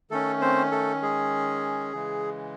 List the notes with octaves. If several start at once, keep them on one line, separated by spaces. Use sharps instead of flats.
D#3 A3 C#4 A4
C4 C5
A3 A4
G#3 G#4
C#3 E3 G#3